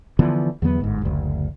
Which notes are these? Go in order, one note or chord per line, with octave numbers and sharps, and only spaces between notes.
D3 E3 F3 B3
E2 D3 F#3 B3
G1 G#2
F#1 D2